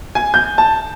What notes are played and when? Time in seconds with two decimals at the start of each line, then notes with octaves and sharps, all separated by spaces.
0.15 G#5
0.34 G6
0.58 A5